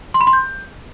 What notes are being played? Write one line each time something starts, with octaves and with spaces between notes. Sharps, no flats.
C6
B5
C6
G6